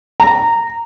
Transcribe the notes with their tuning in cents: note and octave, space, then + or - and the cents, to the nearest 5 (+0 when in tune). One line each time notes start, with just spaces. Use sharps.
A#5 -15